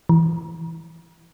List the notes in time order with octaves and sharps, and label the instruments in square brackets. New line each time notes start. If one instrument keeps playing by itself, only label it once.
[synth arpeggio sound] E3